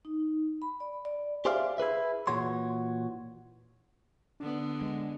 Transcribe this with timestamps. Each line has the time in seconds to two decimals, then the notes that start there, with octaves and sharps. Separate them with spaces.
0.05 D#4
0.62 B5
0.80 D5
1.05 D5
1.45 G4 G#4 C5 D5 E5 F5
1.78 E4 G#4 B4 E5
2.27 A#2 E3 F#4 C#5 C6
4.40 D3 B3 D4
4.82 G#3